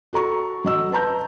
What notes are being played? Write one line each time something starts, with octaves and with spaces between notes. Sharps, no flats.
F#4 A4 A#5 C#6
F#3 D#5 E6
B4 A5 A#5 G6